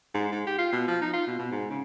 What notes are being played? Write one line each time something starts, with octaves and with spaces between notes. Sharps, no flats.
G#2
G#2
G4
F4
B2
F3
D#4
F4
B2
B2
G#2
C#3